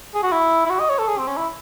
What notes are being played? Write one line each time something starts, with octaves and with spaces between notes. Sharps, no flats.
G#4
F#4
E4
E4
F#4
D#5
C#5
A4
G#4
C4
C#4
E4